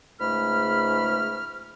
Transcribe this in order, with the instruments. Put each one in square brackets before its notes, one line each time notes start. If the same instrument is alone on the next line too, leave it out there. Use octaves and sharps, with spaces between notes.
[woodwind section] C#2 G#2 A3 B5 F6